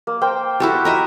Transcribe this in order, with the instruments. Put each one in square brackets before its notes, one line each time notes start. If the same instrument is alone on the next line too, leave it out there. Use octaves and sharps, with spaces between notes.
[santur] A#3
A#4 C5 G5
[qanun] E4 F#4 G4 [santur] A4 A5
[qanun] A#4 D#5 E5